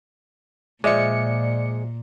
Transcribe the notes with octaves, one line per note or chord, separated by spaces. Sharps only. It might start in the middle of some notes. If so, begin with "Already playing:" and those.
A#2 F3 G#3 C5 D5 E5 F5 C#7